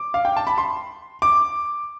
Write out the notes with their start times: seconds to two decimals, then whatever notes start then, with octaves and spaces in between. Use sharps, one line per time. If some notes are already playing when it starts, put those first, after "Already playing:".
Already playing: D6
0.14 F5
0.25 G5
0.37 A5
0.47 B5
0.58 C6
1.22 D6